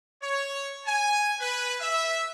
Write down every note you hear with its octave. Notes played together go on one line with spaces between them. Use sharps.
C#5
G#5
B4
E5